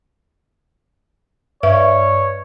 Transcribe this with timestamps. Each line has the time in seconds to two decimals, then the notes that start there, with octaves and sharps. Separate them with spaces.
1.63 G2 C#5 E5